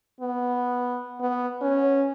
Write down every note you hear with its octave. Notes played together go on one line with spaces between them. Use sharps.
B3
B3
C#4